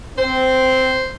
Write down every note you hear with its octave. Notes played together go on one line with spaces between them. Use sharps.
C4 C5